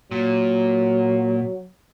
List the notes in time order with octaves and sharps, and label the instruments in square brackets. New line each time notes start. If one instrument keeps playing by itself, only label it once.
[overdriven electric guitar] A#2 [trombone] F#3